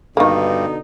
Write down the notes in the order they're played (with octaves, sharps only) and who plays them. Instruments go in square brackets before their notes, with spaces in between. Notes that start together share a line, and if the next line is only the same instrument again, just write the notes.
[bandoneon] G2 [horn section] B2 D3 D#4 [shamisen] D#3 A#3